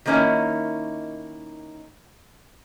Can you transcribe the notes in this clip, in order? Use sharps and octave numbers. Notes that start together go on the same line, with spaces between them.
D#3 A3 A#3 C#4 D#4 E4